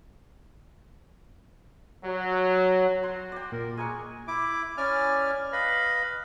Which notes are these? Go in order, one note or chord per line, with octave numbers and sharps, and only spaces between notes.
F#3
F#4 C6
D5 G5
A#2 A#4
G#3 A#4 G#5 C#6
E4 D6
C#4 E4 D5 G#5 F6
B4 D#5 F5 B5